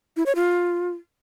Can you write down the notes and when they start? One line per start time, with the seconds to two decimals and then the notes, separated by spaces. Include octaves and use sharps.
0.17 E4
0.26 C#5
0.36 F4